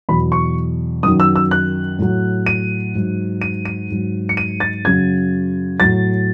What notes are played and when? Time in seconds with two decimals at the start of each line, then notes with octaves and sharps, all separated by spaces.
0.09 E2 B2 F#3 B5
0.32 C#6
1.03 F#2 D#6
1.06 D#3 F#3
1.20 E6
1.36 E6
1.51 F#6
1.98 A2 F#3
2.46 D#7
2.94 G#2 F#3
3.42 D#7
3.65 D#7
3.90 G#2 F#3
4.29 C#7
4.37 D#7
4.60 A6
4.85 F#2 C#3 F#3 G#6
5.80 A2 F#3 A6